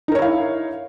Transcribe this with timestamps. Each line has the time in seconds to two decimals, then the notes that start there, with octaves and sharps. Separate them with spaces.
0.08 D#4
0.12 A#4
0.15 C#5
0.18 E4
0.22 F5